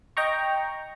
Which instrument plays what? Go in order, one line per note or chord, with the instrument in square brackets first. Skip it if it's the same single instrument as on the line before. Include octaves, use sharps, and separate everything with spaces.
[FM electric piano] D#5 G5 A#5 C#6